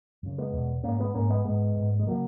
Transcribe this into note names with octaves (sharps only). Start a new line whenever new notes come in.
F#2 C#3
G#3 B3
E2 B2
G#2 A#3 C#4
G#3 B3
G#2 A#3 C#4
G#3 B3
G#2 G#3 B3
G#2
G#3
C#3 F#3 A#3